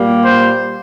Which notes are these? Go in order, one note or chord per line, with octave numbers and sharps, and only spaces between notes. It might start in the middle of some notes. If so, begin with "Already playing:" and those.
Already playing: A#2 G3 A#3
C5